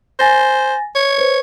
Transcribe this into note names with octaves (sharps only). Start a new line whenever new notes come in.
C5 G#5 A6 A#6
C#5
B4 C5